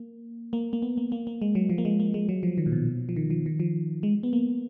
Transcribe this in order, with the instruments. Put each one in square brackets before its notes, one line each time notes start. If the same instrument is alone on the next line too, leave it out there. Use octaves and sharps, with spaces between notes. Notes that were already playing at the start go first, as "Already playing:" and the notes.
Already playing: [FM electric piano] A#3
A#3
A#3
B3
A#3
A#3
A#3
G#3
F#3
F3
A#3
G#3
A#3
G#3
F#3
F3
D#3
A#2
B2
F3
D#3
F3
D#3
F3
G#3
B3
A#3